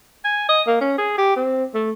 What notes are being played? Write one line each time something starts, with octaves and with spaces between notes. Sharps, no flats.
G#5
D#5
A#3
C#4
G#4
G4
C4
A3